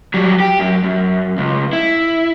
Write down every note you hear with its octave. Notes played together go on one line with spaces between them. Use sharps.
F#3 G3
G4
F#2
F#2
C#2
E4